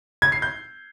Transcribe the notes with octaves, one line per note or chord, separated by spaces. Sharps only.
G#6
C7
G6